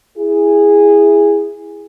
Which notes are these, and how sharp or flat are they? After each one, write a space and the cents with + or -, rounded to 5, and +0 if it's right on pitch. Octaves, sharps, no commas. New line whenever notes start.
E4 +0 G#4 -10